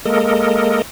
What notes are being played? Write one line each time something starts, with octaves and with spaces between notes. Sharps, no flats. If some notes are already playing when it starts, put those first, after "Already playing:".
G#3 A#3 A4 A#4 D#5